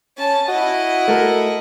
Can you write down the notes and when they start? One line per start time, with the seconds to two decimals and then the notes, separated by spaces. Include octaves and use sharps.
0.17 C#4 A5
0.48 E4 F#4 D#5
1.08 A3 A4 A#4